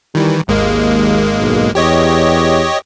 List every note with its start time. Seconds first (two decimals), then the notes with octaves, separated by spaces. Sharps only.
0.15 D#3 E3 G3
0.48 G#1 D#2 G#3 A#3
1.38 B1
1.75 E2 G4 C#5 D#5